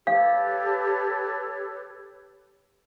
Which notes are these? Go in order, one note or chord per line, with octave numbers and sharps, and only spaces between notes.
G4 A4 B4 C#5 F5